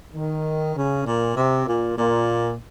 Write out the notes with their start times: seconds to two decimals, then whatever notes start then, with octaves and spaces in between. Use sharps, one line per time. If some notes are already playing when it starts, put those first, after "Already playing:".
0.14 D#3
0.75 C#3
1.05 A#2
1.35 C3
1.67 A#2
1.97 A#2